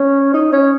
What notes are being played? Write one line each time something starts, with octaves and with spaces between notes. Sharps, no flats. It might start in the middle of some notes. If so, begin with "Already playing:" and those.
Already playing: C#4
D#4
C#4